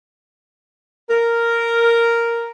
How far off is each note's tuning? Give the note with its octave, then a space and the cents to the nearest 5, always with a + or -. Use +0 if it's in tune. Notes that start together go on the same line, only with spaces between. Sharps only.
A#4 -5